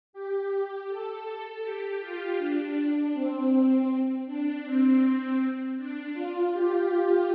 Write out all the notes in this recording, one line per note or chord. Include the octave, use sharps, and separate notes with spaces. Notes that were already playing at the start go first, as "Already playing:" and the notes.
G4
A4
G4
F4
D4
C4
D4
C4
D4
F4
G4